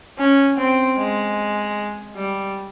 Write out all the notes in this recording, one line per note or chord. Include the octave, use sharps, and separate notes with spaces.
C#4
C4
G#3
G3